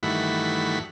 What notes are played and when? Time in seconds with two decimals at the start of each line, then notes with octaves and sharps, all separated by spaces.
0.03 G2 D#3 E3 A3 F#4 B5